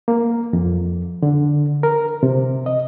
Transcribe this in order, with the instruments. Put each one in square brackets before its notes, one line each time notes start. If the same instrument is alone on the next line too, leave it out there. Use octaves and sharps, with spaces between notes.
[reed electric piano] A#3
F2
D3
A#4
C3
D#5